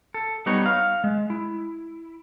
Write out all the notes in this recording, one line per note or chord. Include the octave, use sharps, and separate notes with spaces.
A4
G3 B3 D#4 C#5
F5
G#3
E4